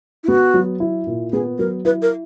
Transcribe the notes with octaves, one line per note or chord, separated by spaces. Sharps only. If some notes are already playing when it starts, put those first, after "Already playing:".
E4
B3 F#4
F#3
E4
A#2
B3 G#4
F#3 A#4
E4 B4
A#4